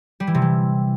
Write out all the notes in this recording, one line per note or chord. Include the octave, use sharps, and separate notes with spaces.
G3
E3
C3
E3